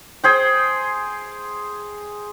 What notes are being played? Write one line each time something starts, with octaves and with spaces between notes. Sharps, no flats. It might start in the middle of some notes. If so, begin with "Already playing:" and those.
G#4 C5 G5